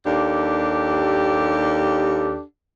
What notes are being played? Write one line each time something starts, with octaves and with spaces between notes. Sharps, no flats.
D#2 D4 G4 A4